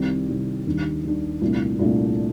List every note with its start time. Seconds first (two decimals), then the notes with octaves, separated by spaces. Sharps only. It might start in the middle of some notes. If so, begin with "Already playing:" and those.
Already playing: C2 C3 D#3 G3
0.28 C2 C3 D#3 G3
0.66 D#2 D#3 G3 D4
1.04 D#2 D#3 G3 D4
1.41 C2 A#2 A3 D4
1.79 C2 A#2 A3 D4